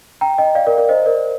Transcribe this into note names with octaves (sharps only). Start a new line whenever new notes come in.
G5 A#5
D#5 G5
D5 F5
A#4 D5
A#4 D5
C5 D#5
A#4 D5